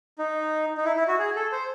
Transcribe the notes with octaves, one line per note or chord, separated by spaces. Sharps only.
D#4
D#4
E4
E4
F#4
G#4
A4
C5